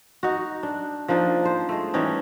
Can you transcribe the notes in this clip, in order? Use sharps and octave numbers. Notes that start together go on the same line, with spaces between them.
D#4 F#4
D4
F3 A#3 D4 D#4
C5
G#3 A3
E3 G3 C#4 D#4